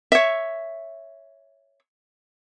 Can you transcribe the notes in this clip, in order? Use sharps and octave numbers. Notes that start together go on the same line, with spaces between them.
C#5 E5